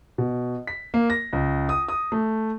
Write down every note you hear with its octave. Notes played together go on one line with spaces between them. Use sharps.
B2
B6
A#3
A#6
C#2
D#6
D#6
A3